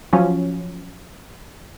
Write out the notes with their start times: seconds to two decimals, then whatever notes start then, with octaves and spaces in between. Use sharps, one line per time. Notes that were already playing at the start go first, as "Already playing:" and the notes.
0.13 F3 F#3 C#4 F4